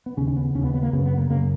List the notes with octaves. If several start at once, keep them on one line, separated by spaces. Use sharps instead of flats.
B3
D#2 C#3 C#4
C#4
B3
D#2 C#3 B3 C#4
B3
A#3
F#2 C#3 B3
B3
A#3
F#2 C#3 A#3